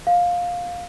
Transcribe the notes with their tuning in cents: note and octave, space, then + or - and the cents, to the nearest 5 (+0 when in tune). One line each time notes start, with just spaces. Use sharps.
F5 +15